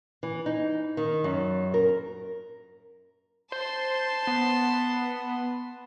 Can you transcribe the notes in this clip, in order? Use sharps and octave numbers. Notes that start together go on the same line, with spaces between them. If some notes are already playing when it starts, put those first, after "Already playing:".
E3
D#4
D#3
F#2
A#4
C5 A5 C6
B3